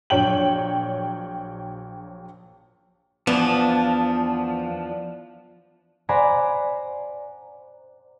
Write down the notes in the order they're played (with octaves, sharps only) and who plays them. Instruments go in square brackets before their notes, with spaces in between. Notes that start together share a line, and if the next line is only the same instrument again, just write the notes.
[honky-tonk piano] A#1 F#3 C#5 G5 F#7
[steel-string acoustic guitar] E2 [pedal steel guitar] F3 [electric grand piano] B3 [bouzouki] D4
[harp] C5 D5 F#5 G#5 A#5 B5